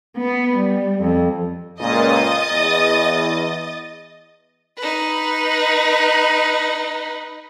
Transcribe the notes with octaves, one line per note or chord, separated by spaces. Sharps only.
B3
G3
F2
C#2 A#2 D#5 D#6 A6
E2
D#4 B4